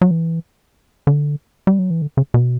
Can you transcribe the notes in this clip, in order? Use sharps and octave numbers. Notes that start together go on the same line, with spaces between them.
F#3
E3
D3
G3
F#3
E3
D3
C#3
B2